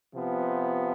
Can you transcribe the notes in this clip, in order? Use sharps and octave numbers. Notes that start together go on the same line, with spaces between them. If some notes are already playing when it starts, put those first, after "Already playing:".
C3 F3 B3